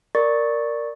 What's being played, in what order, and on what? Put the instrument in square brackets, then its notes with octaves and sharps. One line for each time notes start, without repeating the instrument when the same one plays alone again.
[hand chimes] A#4 D5 C#6 A6